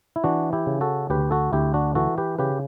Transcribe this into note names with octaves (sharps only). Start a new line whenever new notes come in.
E4
E3 D4 F#4
E4 G4
C#3
F#4 A4
D2 G4 B4
F#4 A4
D2 E4 G4
D4 F#4
E3 F#4 A4
G4 B4
C#3 G4 B4